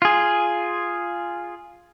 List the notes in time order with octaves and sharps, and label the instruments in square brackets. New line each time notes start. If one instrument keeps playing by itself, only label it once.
[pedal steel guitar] F4 G#4